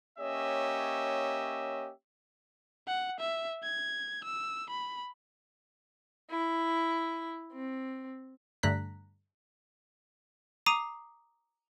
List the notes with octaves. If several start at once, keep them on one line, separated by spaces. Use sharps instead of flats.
A#3 C#4 G4 C#5 D#5 E5
F#5
E5
G#6
E6
B5
E4
C4
G2 D3 A3 A#5 F#6 B6
A#5 D6 D#6 C7 D#7